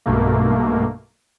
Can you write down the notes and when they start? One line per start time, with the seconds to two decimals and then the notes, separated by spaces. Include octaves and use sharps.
0.06 B1 G2 B2 A3 A#3